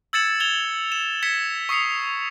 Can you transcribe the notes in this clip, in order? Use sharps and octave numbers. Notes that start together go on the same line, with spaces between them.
E6 G#6 A6 C#7 E7 F#7
G#6 F7 G7
E7
G#6 B6 C#7 E7
C#6 D#6 C7 C#7 F7